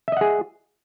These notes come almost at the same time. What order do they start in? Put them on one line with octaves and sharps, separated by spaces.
E5 D#5 F#5 G#4